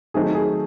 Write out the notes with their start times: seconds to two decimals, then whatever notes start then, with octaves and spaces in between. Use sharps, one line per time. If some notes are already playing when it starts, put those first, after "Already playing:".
0.14 D#3 F#3 A3 C4 D#4 G#4
0.35 G#4